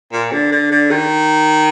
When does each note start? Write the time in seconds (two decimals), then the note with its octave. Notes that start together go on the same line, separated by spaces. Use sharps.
0.12 A#2
0.32 D3
0.52 D3
0.71 D3
0.91 D#3